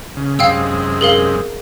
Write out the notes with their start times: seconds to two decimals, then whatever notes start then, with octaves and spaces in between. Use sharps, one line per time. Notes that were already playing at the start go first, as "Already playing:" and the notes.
0.17 C#3
0.39 F#2 C3 G#3 F5 G5 E6
1.01 G#4 A#4 F5